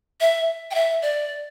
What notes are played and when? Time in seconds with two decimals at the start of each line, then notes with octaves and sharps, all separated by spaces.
0.20 E5
0.71 G5
0.75 E5
1.02 D5